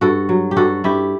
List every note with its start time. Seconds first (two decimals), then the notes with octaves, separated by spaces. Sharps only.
0.01 G2 F#4 A4
0.29 F#3
0.51 G4
0.57 G2 F#4 A4
0.84 G2 E4 G4